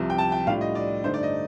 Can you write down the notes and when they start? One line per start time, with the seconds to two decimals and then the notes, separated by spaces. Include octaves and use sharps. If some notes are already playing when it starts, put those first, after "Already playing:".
Already playing: C2 C3 F3
0.10 G5
0.18 A5
0.32 G5
0.47 A2 G3 D4 F4 F5
0.61 D#5
0.75 D5
1.04 G2 D3 A3 D#4 C5
1.14 D5
1.23 D#5